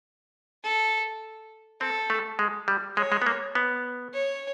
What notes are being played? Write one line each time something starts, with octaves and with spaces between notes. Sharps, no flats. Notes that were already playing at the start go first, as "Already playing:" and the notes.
A4
C4 A4
A3
G#3
G3
G#3 C#5
G#3
B3
A#3
B3
C#5